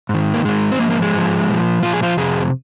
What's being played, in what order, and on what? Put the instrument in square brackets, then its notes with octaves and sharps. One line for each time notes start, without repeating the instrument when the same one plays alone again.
[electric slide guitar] G#2 D#3
A#3
G#2 D#3 G#3
C4
G#2 F3 A#3
A#3
G#3
G#2 F3
A#2 F3
A#2 F3 F4
G#4
F3 F4
F2 C3 G#4